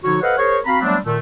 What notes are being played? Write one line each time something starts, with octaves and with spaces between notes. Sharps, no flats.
D3 F3 D#4 F#4 C#5
A4 B4 C5 D#5 F5 F#5
G#4 A#4 C5 C#5
C4 F#4 F5 A#5 B5
F#3 G3 A3 B3 C4 D4
A#2 D#3 A3